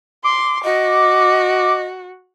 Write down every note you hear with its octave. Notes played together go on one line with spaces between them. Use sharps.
C6 D6
F#4 D#5